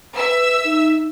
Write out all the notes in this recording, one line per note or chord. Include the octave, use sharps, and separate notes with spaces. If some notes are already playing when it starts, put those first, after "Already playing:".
B4 E5 E6
D#4